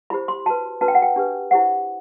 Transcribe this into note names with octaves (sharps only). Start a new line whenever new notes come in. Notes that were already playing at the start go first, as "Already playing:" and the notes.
E4 G4 C5 B5
C6
F#4 B4 A5
D4 F#4 B4 A5
G5
F#5
G5
D4 G4 B4
E4 G4 C5 F#5